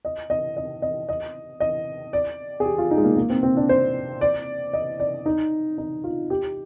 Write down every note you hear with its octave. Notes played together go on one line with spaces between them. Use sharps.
D#5
D#5
D#5
D#5
D#5
D#5
D5
G#4
G4
F4
D#4
G#3
A#3
A#3
C4
C4
D4
C5
D5
D#5
D5
D#4
D#4
F4
G4